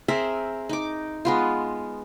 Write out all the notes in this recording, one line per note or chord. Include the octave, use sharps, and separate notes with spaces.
C4 G#4 A#4 E5
D#4 D6
G#3 B3 F4